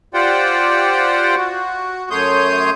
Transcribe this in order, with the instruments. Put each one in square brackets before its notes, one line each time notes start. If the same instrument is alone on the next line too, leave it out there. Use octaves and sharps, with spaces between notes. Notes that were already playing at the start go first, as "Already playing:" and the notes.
[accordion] F4 G4 C5 D5 F#5 G5
F#4
F#2 A3 C#5 C6 D#6 G6